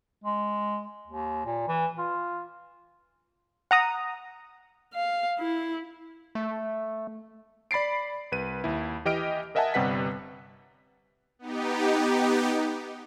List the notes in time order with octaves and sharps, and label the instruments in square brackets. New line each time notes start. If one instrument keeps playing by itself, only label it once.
[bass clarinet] G#3
D#2
A#2
E3
F4
[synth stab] F#5 A#5 D#6
[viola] F5
E4
[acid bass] A3
[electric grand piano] D5 B5 A6 C7 D7
C2 B4 D#7
D#2 E4
E3 G4 D#5 F6 D7
A#4 D#5 E5 F#5 G#5 A5
G1 C3 G3 B4 F#5 B6
[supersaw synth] B3 D#4 G4